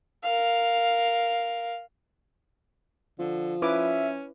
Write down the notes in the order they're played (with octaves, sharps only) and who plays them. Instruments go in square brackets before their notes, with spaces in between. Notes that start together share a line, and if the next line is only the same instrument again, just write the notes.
[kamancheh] A#4 F5
[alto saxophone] D3 [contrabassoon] F3
[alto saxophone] C#4 [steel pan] E4 B4 D6 [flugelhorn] E5